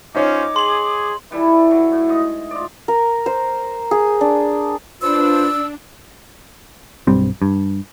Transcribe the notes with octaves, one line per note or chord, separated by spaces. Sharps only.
C#4 D#4 F4 C5 C#5 D6
G#4 C6 F#7
E3 G3 E4 A4
F#3
A2
G#2 D#5
F4 D5
A#4
C5
G#4
D4
D4 F4 B4 C5 E6
B1 G2 G3 C4
G2